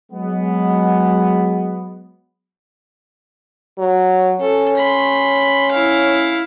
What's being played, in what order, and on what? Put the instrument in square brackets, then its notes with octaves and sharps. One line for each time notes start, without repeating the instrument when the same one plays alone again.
[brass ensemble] F#3 G#3 B3
[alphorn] F#3
[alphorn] C#4 [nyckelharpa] A4
[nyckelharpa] B5 C6
E4 F5